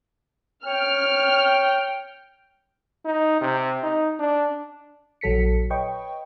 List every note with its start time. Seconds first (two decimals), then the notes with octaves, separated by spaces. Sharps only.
0.66 C#5 G5 F6
3.05 D#4
3.41 C3
3.83 D#4
4.20 D4
5.21 A#1 F#3 A4 B6 C#7
5.70 B4 C#5 D#5 G5 C#6